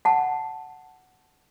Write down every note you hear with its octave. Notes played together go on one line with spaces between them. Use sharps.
F#5 A5